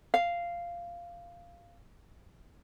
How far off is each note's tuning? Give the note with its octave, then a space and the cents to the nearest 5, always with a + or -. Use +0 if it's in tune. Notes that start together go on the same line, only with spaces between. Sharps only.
F5 -10